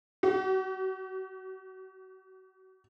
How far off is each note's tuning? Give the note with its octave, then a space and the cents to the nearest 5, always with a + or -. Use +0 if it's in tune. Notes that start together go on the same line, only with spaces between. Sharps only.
F#4 +40